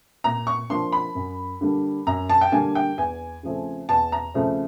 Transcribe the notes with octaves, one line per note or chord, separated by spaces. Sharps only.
A#2 A#5
C#6
F3 A#3 D4 C6
B5
F#2
D3 G3 A#3 D4
F#2 A#5
A5
G5
D3 G3 A#3 D4 G#5
G5
E2 G#5
C#3 F3 A3 C4
E2 A5
A#5
C#3 F3 A3 C4